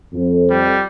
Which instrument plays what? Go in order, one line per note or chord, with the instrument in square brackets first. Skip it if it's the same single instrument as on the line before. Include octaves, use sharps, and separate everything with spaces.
[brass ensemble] F2
[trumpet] G3